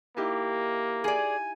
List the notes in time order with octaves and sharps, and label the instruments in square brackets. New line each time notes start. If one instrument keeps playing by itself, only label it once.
[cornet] A#3 [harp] D#4 E4 G4
[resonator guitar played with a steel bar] G#4 D5 [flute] G#5